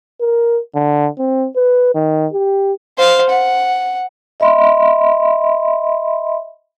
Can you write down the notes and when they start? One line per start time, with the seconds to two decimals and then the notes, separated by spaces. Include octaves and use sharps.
0.21 A#4
0.75 D3
1.18 C4
1.56 B4
1.95 D#3
2.33 G4
2.97 C5 F5
3.29 F#5
4.40 D#5 E5 B5 C6